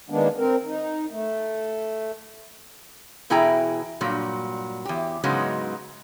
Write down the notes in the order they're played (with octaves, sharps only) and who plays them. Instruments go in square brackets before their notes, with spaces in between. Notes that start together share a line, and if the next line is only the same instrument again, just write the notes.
[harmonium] D#3 G#3 A#3 B3 D4
C4 A#4
D#4
A3
[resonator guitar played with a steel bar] E2 B2 E4 G#4 G5 A#5
G2 A#2 F#3
E2 G4
G#2 C#3 F#3 G#3 B3 D#4